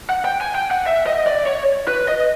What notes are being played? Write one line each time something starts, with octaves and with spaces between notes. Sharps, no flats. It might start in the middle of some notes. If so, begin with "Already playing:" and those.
F#5
G5
G#5
G5
F#5
E5
D#5
D5
C#5
B4
D#5